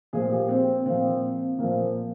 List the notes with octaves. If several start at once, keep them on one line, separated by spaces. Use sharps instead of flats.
A#2 F3 G#4
G4
C4
A#2 F3 C4
A#2 F3 A#3